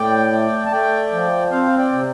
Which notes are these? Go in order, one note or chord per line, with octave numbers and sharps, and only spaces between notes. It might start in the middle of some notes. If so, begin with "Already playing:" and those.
Already playing: A2 D5 G5
A3
A5
A3 D5 G5
F3
C4 C5 F5
D5 G5
C3